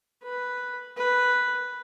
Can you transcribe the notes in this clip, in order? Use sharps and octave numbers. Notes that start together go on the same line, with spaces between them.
B4
B4